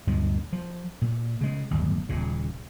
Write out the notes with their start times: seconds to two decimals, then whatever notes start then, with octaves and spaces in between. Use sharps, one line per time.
0.07 D2 G2 A#2 G#3
0.53 F3
1.02 A#2
1.41 C#3 G#3
1.71 D1 G1 D#2
2.09 D#1 A#2 C#3